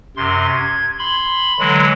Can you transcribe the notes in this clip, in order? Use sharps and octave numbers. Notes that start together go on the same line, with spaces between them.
F#2 C3 C6
G#6
B5 C6
D3 E3 F#3 G#3